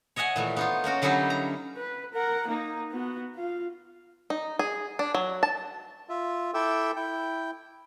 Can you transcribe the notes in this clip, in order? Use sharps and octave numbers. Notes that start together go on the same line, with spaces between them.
C#5 D#5 E5 F#5 G#5
A#2 E3 A3
B3 D#4 F4
A#3 C#4 F#4 A#4
D3 F#3 G3 C#4 D#4 E4
A#5
B4
A#4 F#5
A#3 D#4
B3 F#4
F4 F5
D#4
G#4
D4
F#3
A5
F4 E5
E4 A4 E5 G5 D6 E6
E4 G5